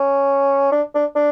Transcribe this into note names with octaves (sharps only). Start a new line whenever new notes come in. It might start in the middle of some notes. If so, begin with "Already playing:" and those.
Already playing: C#4
D4
D4
D4